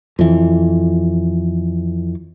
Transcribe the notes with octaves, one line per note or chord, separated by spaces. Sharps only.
F2 E3